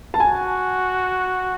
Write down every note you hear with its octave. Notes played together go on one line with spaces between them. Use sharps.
A5
F#4 G#5